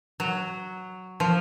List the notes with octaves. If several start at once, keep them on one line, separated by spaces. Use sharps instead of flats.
F#3
F3